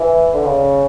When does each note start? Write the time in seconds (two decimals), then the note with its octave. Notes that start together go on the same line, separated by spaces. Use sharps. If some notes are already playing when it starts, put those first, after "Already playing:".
Already playing: E3
0.34 D3
0.45 C#3